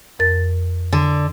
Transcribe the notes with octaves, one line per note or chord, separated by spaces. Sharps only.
F2 A#4 A6
D3